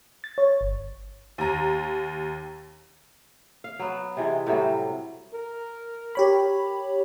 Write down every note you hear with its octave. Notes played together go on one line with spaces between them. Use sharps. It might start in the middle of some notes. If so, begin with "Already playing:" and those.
A6
C#5
G1
D#2 A#5
F5
F#3 B3
C3 E3 G#3
A2 C3 F#3 G3
A#4
G4 C#5 B5